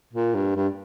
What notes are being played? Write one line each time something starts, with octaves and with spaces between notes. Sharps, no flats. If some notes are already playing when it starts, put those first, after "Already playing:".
A#2
G2
G2